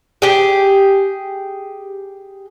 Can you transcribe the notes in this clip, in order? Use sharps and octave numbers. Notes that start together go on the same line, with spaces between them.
G4 G#4